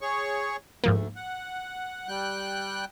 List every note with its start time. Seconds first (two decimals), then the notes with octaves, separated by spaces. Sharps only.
0.01 G#4 C#5 C#6
0.84 D2 G#2 F3 A3 A#3
1.16 F#5
2.08 G3 G5 F#6